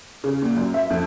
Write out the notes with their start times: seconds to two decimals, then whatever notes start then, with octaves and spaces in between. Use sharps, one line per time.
0.24 C#3
0.42 A#2
0.56 F#2
0.74 E5
0.90 F2